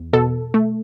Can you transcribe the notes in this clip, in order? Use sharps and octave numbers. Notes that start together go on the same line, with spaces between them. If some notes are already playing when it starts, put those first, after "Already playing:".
Already playing: E2
B2 A4
A3